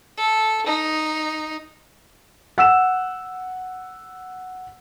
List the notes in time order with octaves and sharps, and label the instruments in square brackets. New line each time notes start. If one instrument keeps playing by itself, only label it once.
[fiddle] A4
D#4
[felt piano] F#5 E6 E7